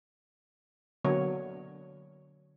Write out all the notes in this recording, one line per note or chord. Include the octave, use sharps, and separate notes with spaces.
D3 F#3 A#3 B3 C#5